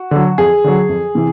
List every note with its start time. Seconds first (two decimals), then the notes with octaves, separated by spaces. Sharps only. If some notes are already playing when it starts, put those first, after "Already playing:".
Already playing: F#4
0.11 D3 F#3
0.38 F2 G#4
0.64 D3 F#3
0.89 F2
1.15 C3 E3